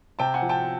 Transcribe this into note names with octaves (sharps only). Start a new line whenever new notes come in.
C3 G5 A5
F#5 G#5
F3
G5 A5